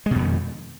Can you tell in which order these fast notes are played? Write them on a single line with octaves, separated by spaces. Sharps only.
G#3 B2 F2 D#3